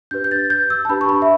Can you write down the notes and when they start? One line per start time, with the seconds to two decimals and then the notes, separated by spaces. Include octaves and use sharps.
0.11 D4 G4 B4 G6
0.24 G6
0.31 A6
0.50 G6
0.70 E6
0.85 A5
0.89 D4 G4 B4 B5
1.01 C#6
1.09 B5
1.22 E5